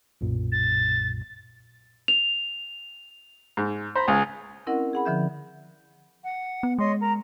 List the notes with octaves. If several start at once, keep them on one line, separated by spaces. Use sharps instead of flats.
B1 F#2 A#2
A6
F7
G#2
C5 A#5 B5
C#2 G#4
C4 C#4 E4 A#4 D#5 F#5
G#4 F#5 B5
D3 F3 E5 G6
F#5
B3
G#3 C#5 D#5 C6
A#4 A#5